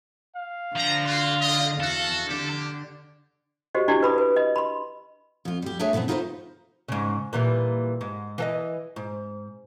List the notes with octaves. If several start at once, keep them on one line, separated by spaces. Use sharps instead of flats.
F5
D3 F3 A#5
A#3 F4 F#4
D5 D#5
E2 F#4 A4
D3 A#3 G4
F#4 G4 C5 D#5
D4 E4 F#4 G4 D5
B4 B5 D#6
B4
D#5
B5 C6
F2 F4
G3 G4
A3 D4 G#4 C#5 E5 G#5
A#2 D3 E3 B3 C4
D#4 F4 F#4 A4 B4 C5
G#2 C#3
A#2 E3 G3
G#2
E3 A4 D#5
G#2